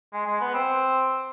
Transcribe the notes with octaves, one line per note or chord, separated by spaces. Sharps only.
G#3
G#3
B3
C4